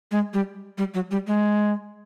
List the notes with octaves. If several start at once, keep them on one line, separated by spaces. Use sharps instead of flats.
G#3
G3
G3
F#3
G3
G#3